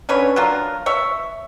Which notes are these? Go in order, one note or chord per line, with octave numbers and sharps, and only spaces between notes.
D3 C#4 B4 C#5
F#3 D4 F4 A#4
C#5 E5